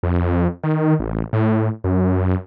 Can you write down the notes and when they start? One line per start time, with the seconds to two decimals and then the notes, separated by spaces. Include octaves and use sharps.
0.03 F2
0.63 D#3
1.00 A1
1.33 A2
1.84 F#2